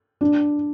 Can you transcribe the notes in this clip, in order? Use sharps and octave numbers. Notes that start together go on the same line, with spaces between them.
D4